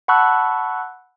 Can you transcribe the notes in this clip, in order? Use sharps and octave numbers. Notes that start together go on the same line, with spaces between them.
F#5 A5 B5 C#6 E6 F#6